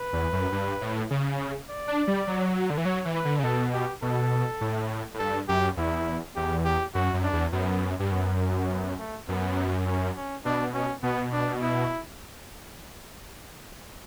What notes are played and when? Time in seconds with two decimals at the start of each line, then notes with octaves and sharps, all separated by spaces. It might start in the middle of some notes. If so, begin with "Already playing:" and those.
Already playing: B4
0.13 E2
0.33 F#2
0.52 G2
0.81 A2
1.11 C#3
1.69 D5
1.88 D4
2.08 G3
2.27 F#3
2.70 D3
2.77 E3
2.85 F#3 C#5
3.05 E3
3.15 B4
3.25 D3
3.39 C#3
3.44 B2 A4
3.73 G4
4.02 B2 A4
4.61 A2
5.14 A2
5.19 G2 A4
5.48 F#2 G4
5.77 E2 E4
6.35 E2 G4
6.65 G4
6.94 F#2 F#4
7.14 F#2
7.23 D4
7.33 E2
7.53 F#2 B3
8.00 G2
8.11 F#2 B3
8.69 B3
8.99 A3
9.28 F#2 B3
9.86 C#4
10.16 C#4
10.45 B2 D4
10.74 C#4
11.03 B2 B3
11.32 D4
11.61 E4